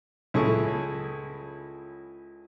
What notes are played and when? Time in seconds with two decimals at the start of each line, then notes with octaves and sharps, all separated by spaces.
0.34 C#2 E4 G#4 A4 C#5 C#6